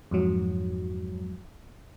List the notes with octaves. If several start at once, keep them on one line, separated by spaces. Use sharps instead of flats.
F2 G#2 F#3